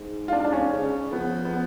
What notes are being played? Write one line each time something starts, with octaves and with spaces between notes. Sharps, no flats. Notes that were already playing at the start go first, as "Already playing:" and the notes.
Already playing: G#2
F4
D4
D4
C#4
C#3
F3 B3
B3